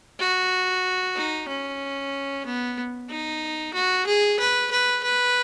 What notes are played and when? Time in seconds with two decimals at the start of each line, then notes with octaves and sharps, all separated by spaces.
0.19 F#4
1.16 D#4
1.49 C#4
2.46 B3
3.10 D#4
3.74 F#4
4.07 G#4
4.39 B4
4.71 B4
5.03 B4